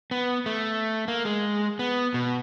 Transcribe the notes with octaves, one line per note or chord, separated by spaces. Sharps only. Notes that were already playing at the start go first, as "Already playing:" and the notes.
B3
A3
A#3
G#3
B3
B2